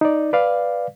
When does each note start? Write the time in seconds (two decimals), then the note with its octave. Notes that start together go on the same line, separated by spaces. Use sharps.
0.01 D#4 D5
0.33 B4 D5 F5